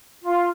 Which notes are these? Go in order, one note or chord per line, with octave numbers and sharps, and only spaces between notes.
F4